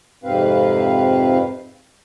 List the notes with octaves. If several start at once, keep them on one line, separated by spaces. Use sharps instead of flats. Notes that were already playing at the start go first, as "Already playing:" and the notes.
F2 G#2 C3 C4 B4 F5